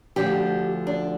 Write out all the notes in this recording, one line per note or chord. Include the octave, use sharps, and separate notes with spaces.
D2 D3 F3 G4
D4